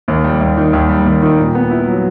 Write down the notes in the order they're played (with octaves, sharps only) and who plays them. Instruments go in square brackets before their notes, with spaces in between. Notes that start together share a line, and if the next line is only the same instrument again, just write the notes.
[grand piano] D#2
G3
D#2
D#3
D#2
G3
D#2
D#3
A#2
B3
E4
F#3